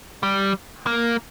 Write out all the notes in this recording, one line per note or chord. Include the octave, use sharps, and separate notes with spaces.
G3
A#3